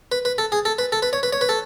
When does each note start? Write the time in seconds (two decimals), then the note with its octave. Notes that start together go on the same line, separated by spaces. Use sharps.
0.12 B4
0.25 B4
0.38 A4
0.52 G#4
0.65 A4
0.79 B4
0.92 A4
1.02 B4
1.13 C#5
1.23 B4
1.33 C#5
1.41 B4
1.49 A4